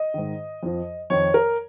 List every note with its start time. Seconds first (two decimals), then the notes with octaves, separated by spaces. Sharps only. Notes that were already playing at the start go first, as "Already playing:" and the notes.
Already playing: D#5
0.14 G#2 D#3
0.63 F2 F3
1.10 F2 D#3 C#5
1.34 A#4